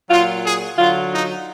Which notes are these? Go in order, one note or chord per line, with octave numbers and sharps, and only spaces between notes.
A#2 F#3 F4
G#4
D3 F#3 F4
D#4